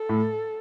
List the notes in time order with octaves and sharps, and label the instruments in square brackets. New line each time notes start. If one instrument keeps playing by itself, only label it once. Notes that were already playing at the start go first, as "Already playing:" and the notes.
Already playing: [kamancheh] A4
[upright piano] A2